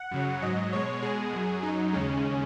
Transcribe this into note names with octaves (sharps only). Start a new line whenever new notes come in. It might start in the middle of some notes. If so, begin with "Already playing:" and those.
Already playing: F#5
F#2 C#3 F#3
G#2 F#3 D#5
B2 G#3 C#5
B2 G#3 G#4
F#2 F#3
F#2 F#3 D#4
D#2 C#3 G#3 C#4